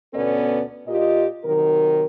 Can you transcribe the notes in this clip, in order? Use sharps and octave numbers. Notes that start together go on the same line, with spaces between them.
D2 B2 B3 C#4 A4 D5
A#2 F4 G4 D#5
C3 D#3 F#3 A#4